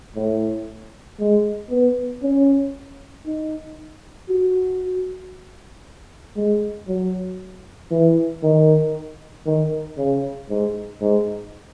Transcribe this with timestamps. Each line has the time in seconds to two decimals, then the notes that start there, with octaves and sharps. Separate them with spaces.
0.16 A2
1.20 G#3
1.70 B3
2.23 C#4
3.26 D#4
4.29 F#4
6.36 G#3
6.88 F#3
7.91 E3
8.43 D#3
9.46 D#3
9.98 C#3
10.49 G#2
11.01 G#2